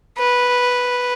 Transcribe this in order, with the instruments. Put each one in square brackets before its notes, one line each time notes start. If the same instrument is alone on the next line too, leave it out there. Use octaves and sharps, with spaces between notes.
[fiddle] B4